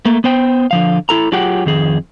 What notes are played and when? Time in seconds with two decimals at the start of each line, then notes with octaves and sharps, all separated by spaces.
0.05 A3 A#3
0.24 B3 C5 G5
0.71 D3 F3 F5
1.09 E4 A4 A#5
1.32 F#3 F4 G4 G#4 F#5 G5
1.66 F2 D#3 G#4